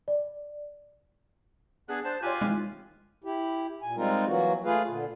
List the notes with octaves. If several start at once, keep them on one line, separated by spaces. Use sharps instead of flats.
D5
B3 D4 G#4 F#6
D4 C5 A5
F4 G4 C#5 G#5 C6 F#6 G6
D#3 E3 G#3 C4
E4 G4
A#2 G#5
G3 G#3 C4 D#4 F4 A#4
E3 F#3 A#3 F#4
A3 F4 G#4 B4 F5
A#2 D3